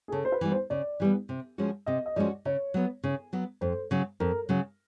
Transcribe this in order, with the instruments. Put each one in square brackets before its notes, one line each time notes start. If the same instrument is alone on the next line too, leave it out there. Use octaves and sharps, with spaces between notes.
[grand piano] G#4
[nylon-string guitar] C#3 [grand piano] A4
[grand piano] C5
B4
[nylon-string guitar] E3 G3 B3
[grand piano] C5
[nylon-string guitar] C#3 [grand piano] D5
[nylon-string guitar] E3 G3 B3
C3
F3 G#3 C#4 F#4
[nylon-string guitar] C3 [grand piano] D#5
[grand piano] D#5
[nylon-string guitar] F3 G#3 C#4 F#4 [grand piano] D5
[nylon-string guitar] C#3 [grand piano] C#5
[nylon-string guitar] F#3 B3
C#3
F#3 B3
[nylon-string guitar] F2 [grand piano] C5
[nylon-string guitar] C#3 F#3
[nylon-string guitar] F2 [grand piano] A#4
[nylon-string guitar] C#3 F#3